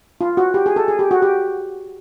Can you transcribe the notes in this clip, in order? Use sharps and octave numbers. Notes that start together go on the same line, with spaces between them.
F4
F#4
G4
G#4
A4
G#4
G4
F#4
G4